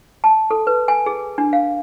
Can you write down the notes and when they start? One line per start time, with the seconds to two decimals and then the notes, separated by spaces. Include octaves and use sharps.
0.24 A5
0.51 A4
0.67 B4
0.88 G#5
1.06 G#4
1.38 D4
1.53 F5